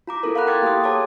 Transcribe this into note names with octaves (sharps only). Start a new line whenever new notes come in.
F4 A#5 D6
B3 E4 F4 A4 A#4
F5 F#5 A#5 B5 F#6
G5 C6 D6 F6 G#6 A6
A#3 G4 C6 D#6
G#4 A4 C#5 A5 D6 D#6